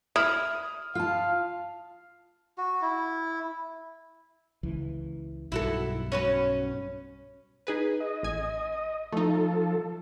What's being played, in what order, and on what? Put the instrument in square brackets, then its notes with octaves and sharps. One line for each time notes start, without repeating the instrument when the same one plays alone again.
[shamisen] E4 [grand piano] D#6 F6
[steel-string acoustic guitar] F4 A5 [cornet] F5
[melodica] F#4
E4
[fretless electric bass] C#2 E3
[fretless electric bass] B1 G2 [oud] E4 F#4 A4
[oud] C#4 F#4 B4
[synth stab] D#4 G#4 B4
[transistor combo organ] D#5
[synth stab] A1 G#5
[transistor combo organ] F3 A4 [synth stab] A3 D#4